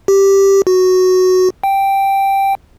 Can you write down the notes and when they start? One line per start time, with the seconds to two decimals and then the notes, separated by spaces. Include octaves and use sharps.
0.08 G4
0.67 F#4
1.63 G5